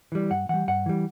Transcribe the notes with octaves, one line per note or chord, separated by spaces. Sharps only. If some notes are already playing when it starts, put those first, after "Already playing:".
E3 G3
G2 F#5
E3 G3 F#5
G2 F#5
E3 G3